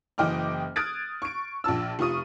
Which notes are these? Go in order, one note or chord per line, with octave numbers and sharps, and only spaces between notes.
F#1 E3 D#5 G5 D6 F6
D#6 F6 F#6 G#6 A6 D7
C#6 D7
A#1 F4 A5 E6
F1 F4 C#6 D#6 D#7